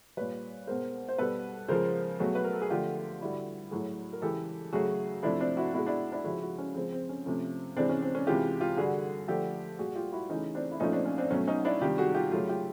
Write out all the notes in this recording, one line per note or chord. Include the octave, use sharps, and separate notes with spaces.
A#2 G3 B4 C#5
B2 G#3 A#4 C5
C5
B2 G3 A4 B4
C#3 F3 G#3 A#4 C5
B2 F#3 A3 F#4 G#4
B4
A#4
A4
G#4
D3 F3 A3 F4 G4
D3 G3 E4 F#4
A2 F#3 A3 F#4 G#4
A#4
C#3 E3 G#3 G4 A4
C#3 F#3 A3 F#4 G#4
C3 F3 A3 D4 E4
C4 D4
E4 F#4
B2 G#3 E4 F#4
D4 E4
D4 E4
C#3 F3 G#3 E4 F#4
E4 F#4
C#4
C#3 F3 G#3 C4
C4
C#4
C3 F3 A3 C#4
C3 E3 G#3 C4 D4
C#4
C4
C#4
C3 E3 G#3 F4 G4
F4 G4
D3 G3 F#4 G#4
D3 F3 A3 G4 A4
A#2 G3 F#4 G#4
F4 G4
E4 F#4
C#3 E3 A3 C#4 D#4
C4 D4
E4
A#2 F3 A3 C#4 D#4
C4 D4
C#4
C4 D4
B2 F#3 A3 C#4
C#4 D#4
D4 E4
C3 D#3 G3 F4 G4
F#4 G#4
F4 G4
C#3 F#3 A3 F4 G4
F4 G4